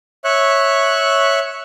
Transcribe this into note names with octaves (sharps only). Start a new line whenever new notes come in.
C#5 E5 C#6 F#6